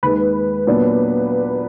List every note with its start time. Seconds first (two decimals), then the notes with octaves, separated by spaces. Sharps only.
0.03 D#2 D#3 G#3 B4
0.67 A#2 F#3 B3 D4